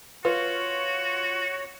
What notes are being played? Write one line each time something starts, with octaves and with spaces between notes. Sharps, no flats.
F4 F#4 B4 C#5